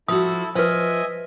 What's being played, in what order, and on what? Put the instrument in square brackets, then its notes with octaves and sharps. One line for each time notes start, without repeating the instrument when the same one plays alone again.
[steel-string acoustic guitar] F3 F#4 [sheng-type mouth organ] E4 A4 [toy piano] D#6
[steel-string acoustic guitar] F3 [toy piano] B4 C5 [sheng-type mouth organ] D#5 E5 G#5